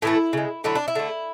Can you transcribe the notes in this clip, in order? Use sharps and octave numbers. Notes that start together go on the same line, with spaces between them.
A2 E3 A3 E4
C#3 G#3
D3 F#3 A3 E4
D4
E4
D3 A3